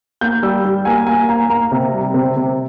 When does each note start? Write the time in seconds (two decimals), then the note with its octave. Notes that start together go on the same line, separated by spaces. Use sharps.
0.21 A#3 G6
0.43 G3 E6
0.64 G3
0.85 A#3 G#5
1.07 A#3 G#5
1.28 A#3 A#5
1.50 A#3 A#5
1.72 C3
1.93 G3
2.14 C3
2.36 C3